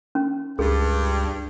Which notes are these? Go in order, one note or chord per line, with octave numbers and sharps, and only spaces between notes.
C#4
C#2 G2 G#4